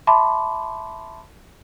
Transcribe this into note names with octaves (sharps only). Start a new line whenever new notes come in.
E5 A5 B5 C6 D6